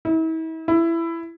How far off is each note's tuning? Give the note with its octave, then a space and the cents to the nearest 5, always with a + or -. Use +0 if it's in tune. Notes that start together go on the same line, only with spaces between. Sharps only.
E4 -40
E4 +15